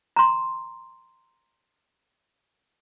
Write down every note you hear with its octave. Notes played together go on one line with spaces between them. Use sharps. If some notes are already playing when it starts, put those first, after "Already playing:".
A#5 C6